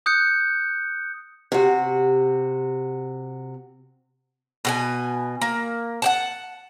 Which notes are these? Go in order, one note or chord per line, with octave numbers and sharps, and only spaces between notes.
D#6 F#6 G6 C#7
C3 F#4
B2 G4 G#5
A#3
F#5 G5 A5